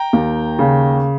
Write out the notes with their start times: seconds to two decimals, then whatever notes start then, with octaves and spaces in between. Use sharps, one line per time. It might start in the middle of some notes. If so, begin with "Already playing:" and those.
Already playing: G5 A#5
0.13 D#2
0.59 C#3